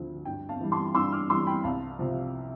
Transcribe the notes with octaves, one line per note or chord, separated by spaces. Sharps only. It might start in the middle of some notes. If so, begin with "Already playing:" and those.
Already playing: D2 D3 F3
G2 G5
F5 A5
E3 G3
A5 C6
G2 C6 E6
D6 F6
E3 G3 C6 E6
G5 B5
C2 F5 A5
C3 F3